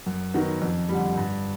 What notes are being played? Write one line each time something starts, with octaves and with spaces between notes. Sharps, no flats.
F#2
D#3 F#3 B3
F2
D3 G3
G2